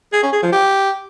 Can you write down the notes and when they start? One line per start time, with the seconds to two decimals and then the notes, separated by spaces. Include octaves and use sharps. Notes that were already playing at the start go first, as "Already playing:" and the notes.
0.13 G#4
0.23 C#4
0.33 G#4
0.42 F3
0.52 G4